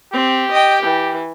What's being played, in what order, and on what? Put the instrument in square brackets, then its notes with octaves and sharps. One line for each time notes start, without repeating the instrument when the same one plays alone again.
[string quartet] C4 [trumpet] G4
[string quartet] D#5 G5
E3